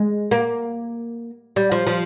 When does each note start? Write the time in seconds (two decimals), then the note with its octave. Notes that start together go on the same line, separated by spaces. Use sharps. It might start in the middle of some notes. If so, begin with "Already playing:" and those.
Already playing: G#3
0.31 A#3
1.56 G3
1.72 F3
1.87 F3